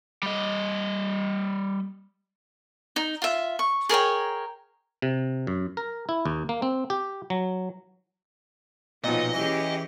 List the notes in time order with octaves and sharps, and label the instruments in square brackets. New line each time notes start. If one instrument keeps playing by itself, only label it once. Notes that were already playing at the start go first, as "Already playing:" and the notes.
[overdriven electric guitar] G3 D#5
[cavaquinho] D#4
F4 E5
C#6
G#4 A#4 C#5 G5
[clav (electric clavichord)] C3
F#2
A#4
E4
D#2
A#3
C4
G4
F#3
[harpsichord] B1 A#2 [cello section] F3 B3 D#4 [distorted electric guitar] D#5
[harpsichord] E3 [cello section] C#4 G4 G#4